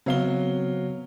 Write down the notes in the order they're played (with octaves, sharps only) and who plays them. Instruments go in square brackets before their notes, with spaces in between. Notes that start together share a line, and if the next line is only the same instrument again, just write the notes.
[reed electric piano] C#3 B3 [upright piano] F#3 F5 G7 [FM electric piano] C4